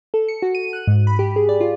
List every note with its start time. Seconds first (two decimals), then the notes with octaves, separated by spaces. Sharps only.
0.14 A4
0.28 C#7
0.42 F#4
0.55 D#7
0.73 F#6
0.87 G#2
1.07 B5
1.19 G4
1.36 G#4
1.49 D5
1.61 F4